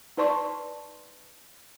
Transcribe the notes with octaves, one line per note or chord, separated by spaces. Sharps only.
D#4 B4 D5 A5 C6 C#6